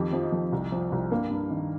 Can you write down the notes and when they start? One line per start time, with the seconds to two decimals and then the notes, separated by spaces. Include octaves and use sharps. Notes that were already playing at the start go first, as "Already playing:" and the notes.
Already playing: F2 D#3 G4
0.13 F3
0.23 D#4
0.32 F2
0.52 C2
0.72 F3
0.92 C2
1.11 G2 A#3
1.31 G2
1.50 D#3